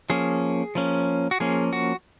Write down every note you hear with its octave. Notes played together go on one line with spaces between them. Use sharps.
F3 A#3 C#4 G#4
F3 A#3 C#4
F#4
F3 A#3 C#4 G#4
F#4